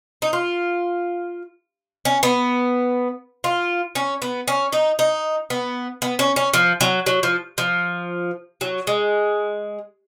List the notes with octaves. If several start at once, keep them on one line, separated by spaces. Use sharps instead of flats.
D#4
F4
C#4
B3
F4
C#4
B3
C#4
D#4
D#4
B3
B3
C#4
C#4
F3
F#3
F#3
F3
F3
F#3
G#3